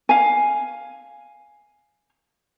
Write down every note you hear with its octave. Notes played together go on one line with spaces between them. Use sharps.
F5 G#5